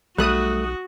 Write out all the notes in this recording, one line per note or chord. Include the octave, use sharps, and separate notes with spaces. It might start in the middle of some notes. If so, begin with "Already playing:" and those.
B1 G3 A3 F#4 D#6 F#6